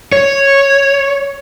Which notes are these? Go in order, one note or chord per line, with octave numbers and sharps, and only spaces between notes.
C#5